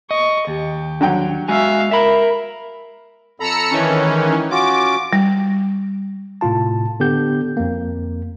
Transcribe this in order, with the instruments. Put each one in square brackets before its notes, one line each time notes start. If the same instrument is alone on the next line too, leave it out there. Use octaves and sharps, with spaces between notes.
[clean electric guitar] D#5 [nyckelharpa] C#6
[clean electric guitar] D#2 [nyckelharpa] G4
[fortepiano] D3 F#3 G5
[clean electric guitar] G#3 F#4 G#5 [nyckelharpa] E5 F5
[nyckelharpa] A#4 [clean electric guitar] E5 B5
[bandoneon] F2 A4 B5 [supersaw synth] A#5 E6 C#7
[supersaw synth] D#3 E3 C#4
[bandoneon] G#3 D#4
[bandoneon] C#4 F4 F#4 [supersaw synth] D6
[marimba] G3
[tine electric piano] A2 C3 F4 A5
D3 B3 G4 G6
F2 A#3